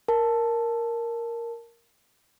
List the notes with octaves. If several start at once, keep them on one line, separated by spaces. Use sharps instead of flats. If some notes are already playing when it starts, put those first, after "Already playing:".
A#4 A5